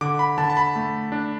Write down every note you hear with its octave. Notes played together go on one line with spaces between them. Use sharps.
D3 D6
B5
D3 A5
A5
B5
A3
D4